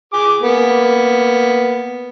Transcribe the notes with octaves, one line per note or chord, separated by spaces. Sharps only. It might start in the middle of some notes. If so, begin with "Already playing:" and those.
G#4 D6
A#3 B3